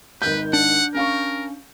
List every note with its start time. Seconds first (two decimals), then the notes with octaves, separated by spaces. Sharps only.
0.22 G#1 D#3 B4 G6
0.53 D4 F#5
0.95 C#4 A#4 F5 C#6